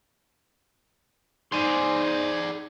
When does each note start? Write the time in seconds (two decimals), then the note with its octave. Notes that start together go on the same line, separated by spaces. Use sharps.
1.52 D#4 G#4 C5 D5 G#5 C6